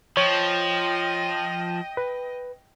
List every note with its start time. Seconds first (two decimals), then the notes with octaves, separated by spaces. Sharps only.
0.17 F3 C#5 D#5 G5
1.97 B4